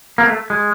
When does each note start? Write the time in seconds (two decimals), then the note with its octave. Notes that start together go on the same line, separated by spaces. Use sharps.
0.18 A#3
0.27 A3
0.50 G#3